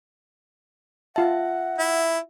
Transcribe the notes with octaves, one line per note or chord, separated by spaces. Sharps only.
F4 E5 F#5 A5
E4